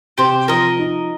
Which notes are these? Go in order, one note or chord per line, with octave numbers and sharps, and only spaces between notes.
C3 G4 C5
F3 A#4 D#5
D#4